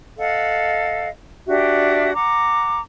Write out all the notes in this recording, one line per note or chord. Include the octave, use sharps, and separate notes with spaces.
A4 D#5 F5 F#5
D4 F#4 G4 E5
F#5 A#5 D6